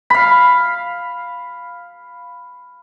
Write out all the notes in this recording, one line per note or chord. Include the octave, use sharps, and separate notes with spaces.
F5 B5